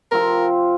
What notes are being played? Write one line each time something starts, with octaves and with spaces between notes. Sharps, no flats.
C3 F3 C4 F4 A#4